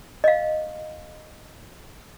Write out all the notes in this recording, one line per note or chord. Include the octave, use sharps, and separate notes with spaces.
D#5 F5